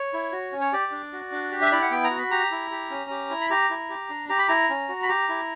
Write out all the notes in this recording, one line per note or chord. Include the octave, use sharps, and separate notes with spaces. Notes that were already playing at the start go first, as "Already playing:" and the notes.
Already playing: C#5
E4
F#4
C#4
C#5
G4 D5
D4
F#4
D4
G4
E5
E4 D5
F#5
B3 G5
A#5
F#4
B5
G4 A#5
E4
G4
C#4
G4
E4
B5
G4 A#5
E4
G4
D4
G4 A#5
B5
E4 A#5
C#4
F#4
B5
G4 A#5
E4